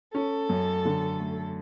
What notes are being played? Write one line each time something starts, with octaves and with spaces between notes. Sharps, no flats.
C#4 A4
F#2
D3
A3